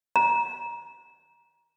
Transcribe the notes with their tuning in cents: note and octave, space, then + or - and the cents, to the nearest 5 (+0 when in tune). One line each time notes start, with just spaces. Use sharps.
A#5 +25